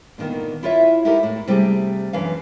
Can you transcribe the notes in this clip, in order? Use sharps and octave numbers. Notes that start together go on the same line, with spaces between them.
A#2 D3 D#3 A#3 B3
E4 F4 C#5 E5
D#4 E4 F#4 G4 A4 A#4
A2
C3 G3 A3 G4 G#4
F#2 E3 D4 F5